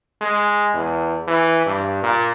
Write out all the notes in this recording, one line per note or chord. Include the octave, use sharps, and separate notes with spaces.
G#3
E2
E3
G2
A#2